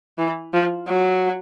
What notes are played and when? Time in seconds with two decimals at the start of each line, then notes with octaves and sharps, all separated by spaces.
0.18 E3
0.54 F3
0.88 F#3